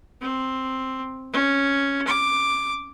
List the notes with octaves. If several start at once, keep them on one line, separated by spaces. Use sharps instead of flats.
C4
C#4
D6